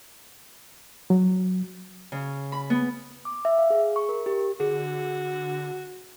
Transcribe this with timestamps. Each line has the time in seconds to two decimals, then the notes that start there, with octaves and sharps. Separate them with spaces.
1.10 F#3
2.12 C#3
2.52 B5
2.70 B3
3.25 D6
3.45 E5
3.58 F5
3.70 G#4
3.96 C#6
4.09 A#4
4.26 G4
4.60 D3 F#4 G#4